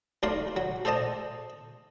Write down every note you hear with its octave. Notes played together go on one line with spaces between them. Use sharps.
B1 A3 A#4 D5 C6
F#3
A4 C5 D5 D#5 A5